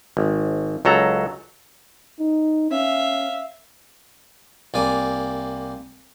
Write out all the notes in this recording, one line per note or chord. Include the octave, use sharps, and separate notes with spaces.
G#1
C#2 F#3 A4 A#5
D#4
C#4 E5 F5
C2 A#3 D5 G#5